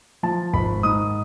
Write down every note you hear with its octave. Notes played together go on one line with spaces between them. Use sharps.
F3 A5
G#1 B5
G#2 D#6